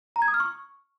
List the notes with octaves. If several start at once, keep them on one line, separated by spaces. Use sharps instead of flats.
A#5
G#6
D#6
F6
C#6